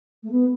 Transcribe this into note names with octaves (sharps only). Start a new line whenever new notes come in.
A3
B3